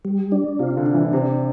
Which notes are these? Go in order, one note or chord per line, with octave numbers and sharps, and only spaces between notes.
G3
D4
C3 F4
D3
D4
E3
C3 D4